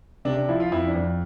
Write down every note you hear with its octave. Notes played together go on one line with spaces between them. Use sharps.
C3 D4
D4
F3 E4
F4
F2 E4
D4
F2